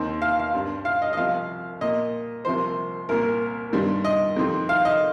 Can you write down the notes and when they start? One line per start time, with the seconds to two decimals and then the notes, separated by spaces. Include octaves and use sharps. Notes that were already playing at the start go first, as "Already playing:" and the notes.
Already playing: D#2 D#3 C4
0.22 F5
0.39 F5
0.53 G2 G3 C4
0.85 F5
1.02 D#5
1.13 D#5
1.17 C2 C3 F3 F5
1.81 A#2 A#3 D#5
2.45 C2 C3 F3 A#3 C5
3.09 C2 A#2 A#3 A#4
3.73 G2 D#3 G3 C4
4.05 D#5
4.36 F2 D#3 C4
4.69 F5
4.85 D#5